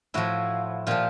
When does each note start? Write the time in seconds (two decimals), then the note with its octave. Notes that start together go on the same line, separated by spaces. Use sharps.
0.14 A2 F3 E4 F#4
0.87 A#2 F3 F4 G4